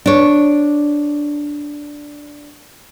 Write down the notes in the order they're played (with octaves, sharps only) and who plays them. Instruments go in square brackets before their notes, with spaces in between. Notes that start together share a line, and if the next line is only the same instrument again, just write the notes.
[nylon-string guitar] D4 C#5